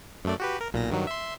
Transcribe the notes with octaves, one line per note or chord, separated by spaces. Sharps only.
F#2 A3 D5
F#4 G4 B4
A#4
B1 A#2 A#6
G2 D#3 F#3
E5 C6